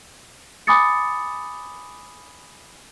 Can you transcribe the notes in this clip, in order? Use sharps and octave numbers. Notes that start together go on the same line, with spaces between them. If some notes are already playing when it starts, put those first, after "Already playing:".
G#5 B5 D6 D#6 A6 C#7